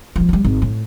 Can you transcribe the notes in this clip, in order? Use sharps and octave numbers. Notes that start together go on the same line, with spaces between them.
F3 G#3
F#3 G3
G#1
A2